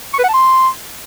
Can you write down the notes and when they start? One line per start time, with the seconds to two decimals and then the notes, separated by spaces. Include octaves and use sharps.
0.14 C#6
0.19 B4
0.24 F#5
0.29 A5
0.34 C6